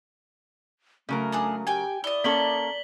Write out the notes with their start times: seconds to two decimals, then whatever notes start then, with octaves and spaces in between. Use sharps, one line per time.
1.09 C#3 F#3 A3 A#4
1.32 D4 G#4 D#6
1.67 G4 G5 G#5
2.04 E4 D5 D#5 G7
2.24 A#3 C#4 A4 B6 F#7 G7